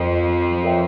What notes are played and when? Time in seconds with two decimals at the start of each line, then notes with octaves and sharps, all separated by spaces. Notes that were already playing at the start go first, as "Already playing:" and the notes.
Already playing: F2 F3 F4 A#4 D#5 G5
0.63 F4 A#4 C#5 E5 G5